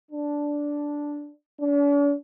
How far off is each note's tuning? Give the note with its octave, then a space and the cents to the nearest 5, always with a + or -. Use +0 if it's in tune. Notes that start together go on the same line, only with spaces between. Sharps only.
D4 -5
D4 -45